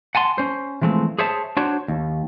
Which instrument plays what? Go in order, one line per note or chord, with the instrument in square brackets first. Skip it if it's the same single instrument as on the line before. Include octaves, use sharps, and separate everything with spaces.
[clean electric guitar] F#5 G#5 A5 C6
C#4 C5
E3 F3 G#3 A3 C4
G#4 C5 C#5 E5 A5
D4 F#4 C5 C#5
D#2